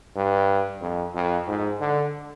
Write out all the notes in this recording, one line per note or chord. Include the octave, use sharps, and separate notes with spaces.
G2
F2
F2
G#2
D3